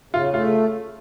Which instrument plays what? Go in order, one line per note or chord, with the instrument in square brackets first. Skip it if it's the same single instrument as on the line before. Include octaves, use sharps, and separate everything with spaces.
[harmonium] C#3 [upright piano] F4
[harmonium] A3 [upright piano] F4